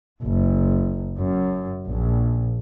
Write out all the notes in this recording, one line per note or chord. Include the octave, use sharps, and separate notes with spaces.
F#1
F#2
A#1